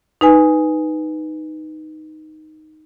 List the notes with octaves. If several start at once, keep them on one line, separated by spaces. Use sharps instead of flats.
D#4 B4 G#5